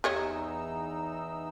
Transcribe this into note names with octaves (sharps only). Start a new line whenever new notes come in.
E2 D#4 G4 C#5 D#5 E6